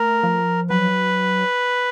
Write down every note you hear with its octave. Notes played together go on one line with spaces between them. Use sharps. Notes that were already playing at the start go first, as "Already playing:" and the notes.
Already playing: A3 A#4
F3
F#3 B4